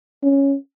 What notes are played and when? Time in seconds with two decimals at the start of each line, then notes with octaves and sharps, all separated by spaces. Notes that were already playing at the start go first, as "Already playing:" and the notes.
0.23 C#4